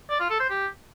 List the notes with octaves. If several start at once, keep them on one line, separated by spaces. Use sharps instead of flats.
D5
F4
A4
C5
G4